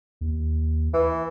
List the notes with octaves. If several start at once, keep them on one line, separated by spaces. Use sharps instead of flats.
D#2
E3